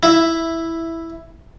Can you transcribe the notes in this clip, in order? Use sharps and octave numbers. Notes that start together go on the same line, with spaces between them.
E4